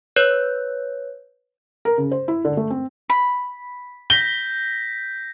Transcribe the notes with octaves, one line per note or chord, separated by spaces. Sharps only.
B4 C#5 F#6 G6
A#4
C#3
C5
E4
D3
A3
C4
B5
G6 A#6 B6 G7